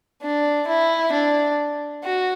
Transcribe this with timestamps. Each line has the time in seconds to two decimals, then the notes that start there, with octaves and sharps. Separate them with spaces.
0.22 D4
0.67 E4
1.13 D4
2.04 F#4